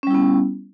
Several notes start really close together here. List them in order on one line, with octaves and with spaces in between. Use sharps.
C#4 G3 E4 B3